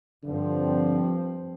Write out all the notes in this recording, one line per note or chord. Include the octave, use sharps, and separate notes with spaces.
G2 D3 F3 C4